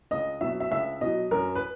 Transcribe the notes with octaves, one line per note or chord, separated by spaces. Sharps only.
C#2 D#5
B2 F#3 E5
E5
C#2 E5
B2 F#3 D#5
F#2 A#4
B4